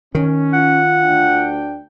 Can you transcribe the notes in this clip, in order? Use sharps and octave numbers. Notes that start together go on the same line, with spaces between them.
D#3 C#4
F4 F#5
D2 D4 G5